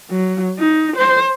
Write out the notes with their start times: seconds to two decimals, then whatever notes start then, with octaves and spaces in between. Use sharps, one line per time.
0.11 F#3
0.59 D#4
0.97 C5